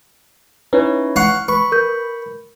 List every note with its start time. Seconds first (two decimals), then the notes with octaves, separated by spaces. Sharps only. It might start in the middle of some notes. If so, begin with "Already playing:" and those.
0.73 C#4 D#4 E4 B4 C#5
1.16 F5 F#5 C#6
1.48 B4 B5 C#6
1.72 A#4 G6